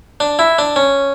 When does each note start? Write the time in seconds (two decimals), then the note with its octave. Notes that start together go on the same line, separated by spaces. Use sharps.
0.20 D4
0.39 E4
0.59 D4
0.76 C#4